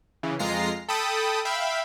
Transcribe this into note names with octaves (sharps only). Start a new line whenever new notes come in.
C#3 E3
F2 G#3 F4 A#5 A#6 C7
A4 G5 A5 B5 D#6
E5 F5 G5 B5